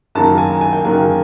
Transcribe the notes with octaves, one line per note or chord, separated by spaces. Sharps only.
F#2 D#3 F#3 A#3 A5
G#5
G#5
G5
F#2 D#3 F#3 A#3 G#5